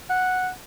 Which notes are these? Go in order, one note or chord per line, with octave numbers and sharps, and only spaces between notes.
F#5